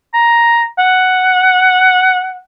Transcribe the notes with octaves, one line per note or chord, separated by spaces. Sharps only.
A#5
F#5